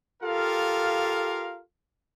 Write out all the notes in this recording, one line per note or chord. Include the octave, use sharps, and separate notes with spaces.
F4 G4 A4 A#4 F5